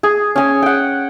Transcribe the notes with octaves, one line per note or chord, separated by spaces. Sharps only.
G#4
C#4 G#5
F#5 G5